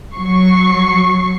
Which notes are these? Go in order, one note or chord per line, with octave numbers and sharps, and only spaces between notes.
F#3 C#6 C7